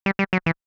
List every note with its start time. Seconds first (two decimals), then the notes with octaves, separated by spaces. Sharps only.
0.06 G3
0.19 G3
0.33 F#3
0.46 E3